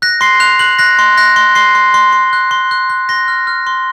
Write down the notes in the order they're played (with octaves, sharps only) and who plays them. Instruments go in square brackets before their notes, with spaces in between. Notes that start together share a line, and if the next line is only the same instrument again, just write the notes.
[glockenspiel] F#6 A#6
C6 C7
F#6 F7
F#6 F#7
F#6 A#6
C6
F#6 A#6
C6
C6 C7
C6
C6
C6
F#6
C6
F#6
F#6
C6 A#6
F6
F6
C6